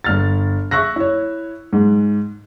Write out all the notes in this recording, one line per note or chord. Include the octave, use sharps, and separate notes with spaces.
G1 F6 A6
E5 C#6 E6 F#6 A#6
E4 C#5
G#2